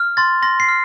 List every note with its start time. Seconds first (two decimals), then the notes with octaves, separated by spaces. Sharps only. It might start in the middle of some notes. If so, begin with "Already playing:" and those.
Already playing: F6
0.17 C6 A6
0.42 C6 A#6
0.60 C7
0.68 F6